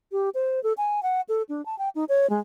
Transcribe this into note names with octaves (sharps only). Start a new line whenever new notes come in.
G4
C5
A4
G#5
F#5
A4
D4
A5
G5
D#4
C#5
G#3